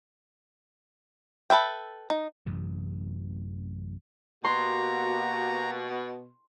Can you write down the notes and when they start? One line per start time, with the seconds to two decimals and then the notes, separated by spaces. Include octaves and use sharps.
1.50 A4 B4 E5 G5
2.10 D#4
2.46 A1 F#2 C3 E3
4.45 B2 A#3 F#4 G4 A#5 C6